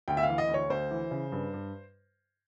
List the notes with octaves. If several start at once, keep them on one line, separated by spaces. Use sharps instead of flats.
D2 G5
E5
F5
E3
D#5
D2
C#5
D2 C5
E3
C#3
G2
G2